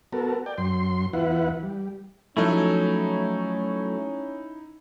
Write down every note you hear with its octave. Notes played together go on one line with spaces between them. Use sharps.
B3 F#4 A4 A#4
D5 G5
F#2 C6
E2 E4 F4 B4 F#5
G3
F3 F#3 A3 C#4 D#4 E4 A5 G#6